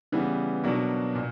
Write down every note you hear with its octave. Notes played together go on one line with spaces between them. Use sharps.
C#3 E3 G3 B3
B2 F#3 A#3 D4
A#2